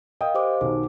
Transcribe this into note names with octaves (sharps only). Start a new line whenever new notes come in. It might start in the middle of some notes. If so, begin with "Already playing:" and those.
A#4 D#5 F5 G5 D#6
G4 C5 D6
B1 B2 D#3 D6